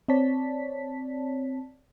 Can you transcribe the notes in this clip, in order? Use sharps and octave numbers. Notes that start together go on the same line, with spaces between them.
C4 C#5 D5 A5 B6